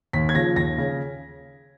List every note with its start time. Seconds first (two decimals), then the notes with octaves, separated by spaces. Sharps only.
0.13 D#2 B6
0.29 G#6
0.35 C#3 F3 A#6
0.56 D#2 A#6
0.78 C#3